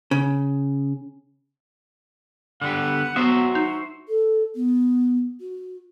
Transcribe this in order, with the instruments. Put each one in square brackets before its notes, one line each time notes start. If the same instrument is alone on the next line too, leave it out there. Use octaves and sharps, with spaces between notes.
[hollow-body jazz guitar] C#3
[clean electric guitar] D3 G3 B3 [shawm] F#5
[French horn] F#3 [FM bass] B3 [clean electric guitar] F#4 C5 E5
[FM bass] D#4 [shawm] C6
[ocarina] A4
B3
F#4